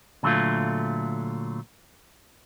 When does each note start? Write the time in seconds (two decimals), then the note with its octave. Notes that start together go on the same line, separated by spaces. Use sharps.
0.23 A#2 D3 F#3 G3 A3 F4